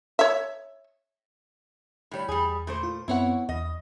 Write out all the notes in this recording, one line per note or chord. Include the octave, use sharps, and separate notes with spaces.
C#5 E5
A2 G3 C#5 B5
E2 G3 G#4
A#2 A3 C5
F4
F#2 B3 C4 E4 C#5 F#5
E2 D#5